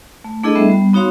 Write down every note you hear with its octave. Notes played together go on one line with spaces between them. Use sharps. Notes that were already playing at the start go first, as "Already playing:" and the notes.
A3
A3 D4 E4 G#4 A4 D#5
G3 B3 E5
G3 B3
B3 D#4 F#4 C#5 F5 C6